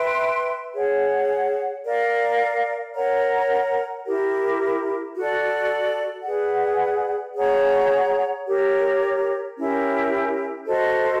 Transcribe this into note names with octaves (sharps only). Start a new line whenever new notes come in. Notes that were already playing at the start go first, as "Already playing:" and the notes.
Already playing: B4 E5 G5 C6
G#4 C#5 F#5
A#4 D5 F5
A#4 C#5 F#5 A#5
E4 G4 A#4
F#4 A4 D5
G#4 B4 D5 F#5
G#4 C#5 F#5 A#5
G4 A#4 C#5
C#4 E4 G4 A#4
F#4 A4 C5 D#5